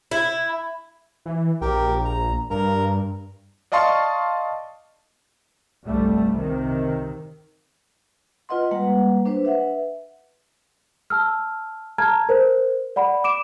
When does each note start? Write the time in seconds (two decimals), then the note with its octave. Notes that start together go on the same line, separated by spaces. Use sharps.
0.11 E4
1.26 E3
1.61 A#1 G4 A#4 G5
2.05 A#5
2.50 G2 A#4 A#5
3.72 D5 D#5 F5 A5 C6 C#6
5.86 G1 C2 G3 A3
6.36 C3 D#3
8.49 F4 B4 D#5 F#5 C6
8.71 G3 G#3 A#3 B4 F#5
9.25 D4 B4 C5
9.45 B4 E5 F#5
11.10 A5 E6 F6
11.98 A5 A#5 F6 G#6
12.29 A#4 C5
12.96 D5 F#5 B5
13.24 D6 D7 E7